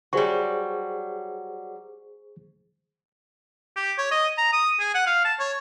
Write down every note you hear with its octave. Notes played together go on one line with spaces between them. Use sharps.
F#3 G3 G#4 C5 C#6
G4
C#5
D#5
A#5
D#6
G#4
F#5
F5
A5
C#5